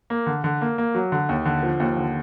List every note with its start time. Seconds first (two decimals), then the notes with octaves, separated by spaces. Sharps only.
0.10 A#3
0.26 D3
0.44 D3
0.61 A#3
0.78 A#3
0.95 F#3
1.12 D3
1.29 D#2
1.45 D3
1.63 F3
1.80 D#2
1.97 D3